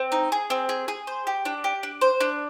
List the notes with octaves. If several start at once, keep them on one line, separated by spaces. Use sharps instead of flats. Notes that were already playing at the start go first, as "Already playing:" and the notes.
Already playing: C4
D#4
G#4
C4
G#4
G#4
C5
G4
D4
G4
D4
C5
D4